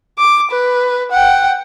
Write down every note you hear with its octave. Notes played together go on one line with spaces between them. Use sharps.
D6
B4
F#5 G5